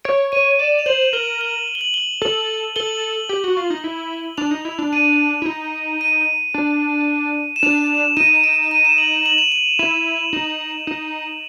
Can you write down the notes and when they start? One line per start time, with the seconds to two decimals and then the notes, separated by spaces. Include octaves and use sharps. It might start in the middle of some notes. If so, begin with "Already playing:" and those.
0.05 C#5 D7
0.32 C#5 D#7
0.59 D5 E7
0.79 F7
0.86 C5 F#7
1.13 A#4 G7
1.41 G7
1.68 F#7
1.75 G7
1.81 F#7
1.94 G7
2.22 A4 F#7
2.76 A4 G7
3.29 G4
3.44 F#4
3.57 F4
3.70 D#4
3.84 E4
4.37 D4 F7
4.51 D#4
4.65 E4
4.78 D4
4.92 D4 D#7
5.42 E4
5.46 D#4
6.01 D#7
6.54 D4
7.56 E7
7.63 D4 F7
8.17 D#4 D#7
8.44 D7
8.71 D#7
8.85 E7
8.98 F#7
9.26 F#7
9.38 F7
9.52 F#7
9.79 E4 F7
10.33 D#4
10.87 D#4